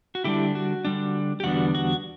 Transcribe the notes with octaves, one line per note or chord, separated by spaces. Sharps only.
F#4
D3 G3 D4 E4 G4
F#4
D3 G3 D4
G4
E2 D3 G3 B3 D4 F#4
F#4